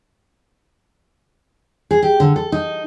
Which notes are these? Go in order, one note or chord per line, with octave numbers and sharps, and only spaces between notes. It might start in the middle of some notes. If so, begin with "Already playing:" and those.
G#4
G4
D3
A4
D#4